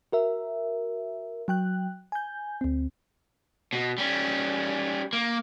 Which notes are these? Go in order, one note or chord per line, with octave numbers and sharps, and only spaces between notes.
F#4 A#4 E5
F#3 G5 F#6
G#5 G6
D2 C4
B2
G3 C#4
A#3